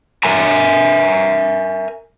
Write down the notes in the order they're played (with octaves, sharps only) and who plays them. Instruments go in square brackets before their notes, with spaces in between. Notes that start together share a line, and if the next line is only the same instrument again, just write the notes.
[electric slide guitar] A#4 E5 G#5 A#5